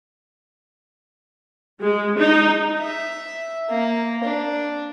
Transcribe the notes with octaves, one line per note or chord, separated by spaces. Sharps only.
G#3
D#4
E5
A#3
D4